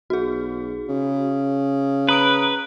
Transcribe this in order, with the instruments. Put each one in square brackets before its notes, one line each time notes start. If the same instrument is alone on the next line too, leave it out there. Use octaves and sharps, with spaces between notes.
[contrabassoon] B1 [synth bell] F#4 G#4
[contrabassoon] C#3
[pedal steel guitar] B4 [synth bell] A#5 D#6 D7